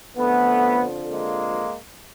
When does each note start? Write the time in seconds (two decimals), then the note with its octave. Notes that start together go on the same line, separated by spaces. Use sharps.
0.17 F2 D3 F3 A3 B3
1.10 G#3 A#3